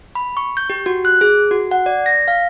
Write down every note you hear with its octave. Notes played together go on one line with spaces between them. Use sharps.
B5
C#6
G6
G4
F#4
F#6
G#4
F#4
F#5
D5
A#6
F5